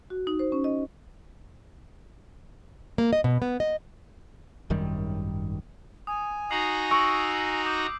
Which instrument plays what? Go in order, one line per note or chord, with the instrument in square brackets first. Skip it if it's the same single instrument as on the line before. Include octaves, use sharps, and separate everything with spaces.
[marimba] F#4
D#4
C5
C#4
D#5
[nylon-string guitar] A#3
D#5
B2
B3
D#5
[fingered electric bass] G#1 F#2 D#3 G3
[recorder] G#5 [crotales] D#6
[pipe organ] D#4 F#4 A#5 [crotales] D#6 C7 F#7
[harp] C#6 [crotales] E6 D7
[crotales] D6 D#6 G6